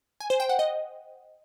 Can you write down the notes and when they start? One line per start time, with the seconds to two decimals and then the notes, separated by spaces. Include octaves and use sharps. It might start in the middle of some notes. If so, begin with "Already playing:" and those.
0.20 G#5
0.30 C5
0.40 G5
0.49 F#5
0.59 D#5